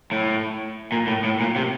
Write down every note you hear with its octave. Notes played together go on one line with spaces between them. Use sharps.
A2
A#2
A2
A2
A#2
C3